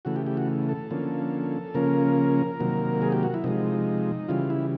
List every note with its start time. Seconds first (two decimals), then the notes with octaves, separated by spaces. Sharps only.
0.05 C#3 E3 A3 F#4
0.16 G4
0.27 G4
0.37 F#4
0.69 A4
0.91 D3 F3 A#3 C#4
1.74 C#3 F3 A#3 C#4 A#4
2.59 C3 D#3 F#3 A#3
3.02 G#4
3.12 G4
3.23 F#4
3.34 E4
3.44 C3 F3 G#3 D#4
4.28 C#3 E3 G3 F4
4.50 E4